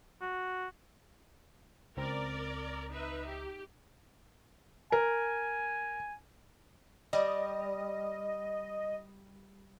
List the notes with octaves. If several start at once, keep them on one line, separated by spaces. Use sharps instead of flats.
F#4
C#2 C4 A#4 D5 A#5
D#4 B4 E5
G4
A#4 G#5
G3 D#5